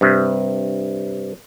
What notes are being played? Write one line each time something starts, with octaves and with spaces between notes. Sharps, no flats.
G2 C3